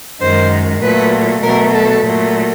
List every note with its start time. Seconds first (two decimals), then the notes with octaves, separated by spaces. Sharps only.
0.21 F#2 D#3 G#3 C5
0.82 A#2 F#3 A3 B4
1.43 B2 F#3 A3 A#4
1.73 A4
2.04 A#2 F#3 A3